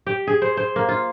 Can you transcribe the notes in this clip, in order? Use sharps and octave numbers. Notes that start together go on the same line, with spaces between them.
G4
G#4
C5
C5
A#3
F4